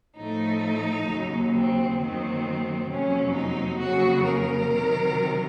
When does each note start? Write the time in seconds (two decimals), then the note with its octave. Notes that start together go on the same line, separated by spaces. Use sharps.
0.17 A2 F3 A3 D#4
1.08 D#2 C#3 F#3 A#3
1.53 C4
1.98 F#2 D#3 F#3 A#3 C4
2.88 F2 C3 F#3 A#3 C#4
3.34 D#4
3.79 F2 C#3 F#3 A#3 F#4
4.25 A#4
4.70 C3 D#3 F#3